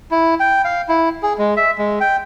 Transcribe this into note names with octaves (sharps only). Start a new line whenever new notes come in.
E4
G5
F5
E4
G#4
G#3
E5
G#3
G5